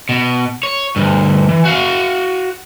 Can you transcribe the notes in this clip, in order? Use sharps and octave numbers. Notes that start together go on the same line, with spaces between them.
B2
C#5
D2 G2
E3
F#4 F5